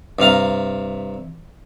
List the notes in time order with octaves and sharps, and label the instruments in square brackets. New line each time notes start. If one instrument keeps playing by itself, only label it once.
[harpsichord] G2 C3 F5 A#5